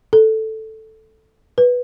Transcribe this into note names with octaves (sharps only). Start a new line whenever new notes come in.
A4
B4